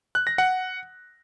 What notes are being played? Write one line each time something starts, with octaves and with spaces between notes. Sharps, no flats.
F#6
A#6
F#5